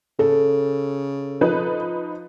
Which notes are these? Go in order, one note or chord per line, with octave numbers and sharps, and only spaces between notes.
C#3 A4
F3 D#4 B4